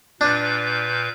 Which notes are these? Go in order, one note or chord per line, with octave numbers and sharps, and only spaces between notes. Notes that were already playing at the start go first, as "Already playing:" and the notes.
A#2 D4 B4 G6